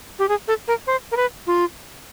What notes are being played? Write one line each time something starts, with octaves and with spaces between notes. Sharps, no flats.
G4
G#4
A4
A#4
C5
A#4
B4
F4